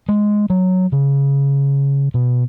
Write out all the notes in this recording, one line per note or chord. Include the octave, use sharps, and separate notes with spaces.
G#3
F#3
C#3
B2